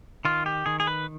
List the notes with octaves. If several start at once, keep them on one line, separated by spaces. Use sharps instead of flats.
D#3 F4
G4
D#3 G#4
G#4
B4